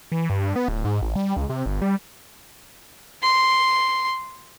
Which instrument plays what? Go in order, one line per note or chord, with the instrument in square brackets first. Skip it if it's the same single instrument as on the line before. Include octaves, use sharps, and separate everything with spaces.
[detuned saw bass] E3
G2
B3
D1
G#2
A1
G3
C#2
C3
G1
G3
[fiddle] C6